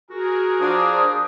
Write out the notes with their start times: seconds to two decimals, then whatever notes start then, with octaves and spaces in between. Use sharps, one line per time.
0.10 F#4 G#4 A#4
0.60 F3 D4 C5 D6 D#6